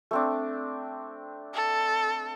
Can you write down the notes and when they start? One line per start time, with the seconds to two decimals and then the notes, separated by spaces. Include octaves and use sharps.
0.11 A3 C4 D4
1.54 A4